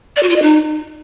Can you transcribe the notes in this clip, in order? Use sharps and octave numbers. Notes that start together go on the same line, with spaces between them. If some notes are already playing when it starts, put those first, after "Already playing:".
D5
F#4
F4
D#5
D#4